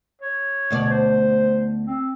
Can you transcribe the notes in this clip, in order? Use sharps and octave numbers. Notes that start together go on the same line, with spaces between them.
C#5
D2 B2 D5
C5
C4